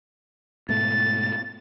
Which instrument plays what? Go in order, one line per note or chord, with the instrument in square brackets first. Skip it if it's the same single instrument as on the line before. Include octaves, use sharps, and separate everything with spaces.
[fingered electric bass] G#2 B2 A3 [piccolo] A6